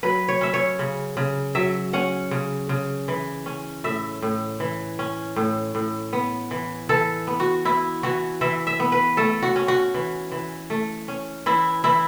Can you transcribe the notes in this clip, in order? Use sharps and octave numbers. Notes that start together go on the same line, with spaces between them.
F#3 B4
C#5
C#4 E5
C#5
C#3
C#3
F#3 E5
C#4 F#5
C#3
C#3
E3
C#4
A2 E5
A2
E3
C#4
A2
A2
B3
E3
E3 A4
B3
F#4
B3 E4
E3 F#4
E3 E5
E5
B3
B4
A3 A4
F#4
C#4
F#4
E3
E3
A3
C#4
E3 E4
E3 E4